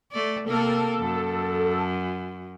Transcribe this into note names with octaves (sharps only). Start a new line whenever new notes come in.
A3 D5
C3 A#3 A4 A#4
F#2